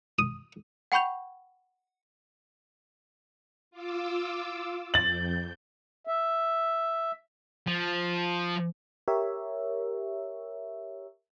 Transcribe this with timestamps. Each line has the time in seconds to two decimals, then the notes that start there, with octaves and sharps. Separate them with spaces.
0.19 D#6
0.92 F#5 G5 B5 C#6 G6 F7
3.71 F4 D6 E6
4.94 F2 G6 A6 F#7
6.07 E5
7.67 F3
9.08 G4 A#4 C#5 E5